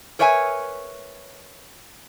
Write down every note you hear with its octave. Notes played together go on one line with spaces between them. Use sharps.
A#4 B4 C#5 E5 G5 G#5